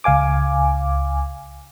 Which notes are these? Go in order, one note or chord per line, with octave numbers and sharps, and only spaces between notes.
C#2 F5 G#5 D6